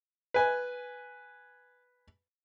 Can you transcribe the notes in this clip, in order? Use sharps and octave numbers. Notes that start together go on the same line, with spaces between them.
B4 G#5